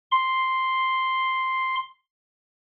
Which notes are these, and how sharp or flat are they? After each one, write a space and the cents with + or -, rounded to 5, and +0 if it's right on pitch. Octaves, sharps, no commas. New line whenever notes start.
C6 +0